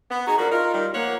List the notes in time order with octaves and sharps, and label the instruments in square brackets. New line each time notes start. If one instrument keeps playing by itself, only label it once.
[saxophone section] B3
[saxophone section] D#4 F#4 G#4 [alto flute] A#5
[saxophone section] F3 D4 F#4 [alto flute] A#4
[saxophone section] D#4 A#4 [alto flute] F4
[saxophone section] D#3 G3
[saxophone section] F3 C#5 F#5 [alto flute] A#3